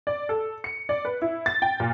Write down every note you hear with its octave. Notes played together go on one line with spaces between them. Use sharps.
D5
A4
C#7
D5
B4
E4
A6
G5
A#2